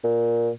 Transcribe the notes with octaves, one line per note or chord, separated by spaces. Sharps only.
A#2